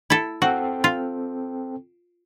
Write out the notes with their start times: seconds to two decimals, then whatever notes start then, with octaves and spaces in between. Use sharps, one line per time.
0.10 E4 A4
0.42 C4 F#4 A4 G5
0.84 F4